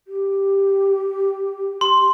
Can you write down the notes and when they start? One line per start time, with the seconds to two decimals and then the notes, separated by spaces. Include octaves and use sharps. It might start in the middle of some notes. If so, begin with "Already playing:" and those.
0.07 G4
1.81 C6